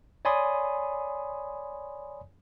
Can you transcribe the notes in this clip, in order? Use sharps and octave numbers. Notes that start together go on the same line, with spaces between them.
C#5 D5 G#5 B5 C6 D#6